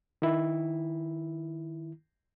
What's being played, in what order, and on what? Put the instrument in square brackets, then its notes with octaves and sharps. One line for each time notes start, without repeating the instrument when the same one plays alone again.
[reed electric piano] D#3 E4